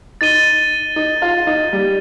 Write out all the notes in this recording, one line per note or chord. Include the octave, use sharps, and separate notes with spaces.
D#4 A6 D#7 G7
D#4
F4
D#4
G3